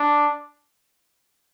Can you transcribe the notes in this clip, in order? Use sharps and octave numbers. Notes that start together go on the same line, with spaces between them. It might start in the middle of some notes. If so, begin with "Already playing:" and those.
Already playing: D4